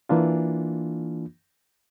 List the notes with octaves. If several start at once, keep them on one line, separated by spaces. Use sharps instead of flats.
E3 A#3 D4 F4